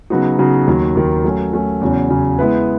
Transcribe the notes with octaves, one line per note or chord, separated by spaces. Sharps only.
C#3 F#3 B3 D#4 F#4
C#3 F#3 B3 D#4 F#4
D#2 D#3 F#3
D#2 D#3 F#3
F#3 A3 C#4
F#3 A3 C#4
E2 C#3 F#3 C#4
E2 C#3 F#3 C#4
G#3 B3 E4 B4